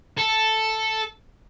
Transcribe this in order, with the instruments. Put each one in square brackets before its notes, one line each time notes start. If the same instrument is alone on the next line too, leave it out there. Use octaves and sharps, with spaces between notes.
[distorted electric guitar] A4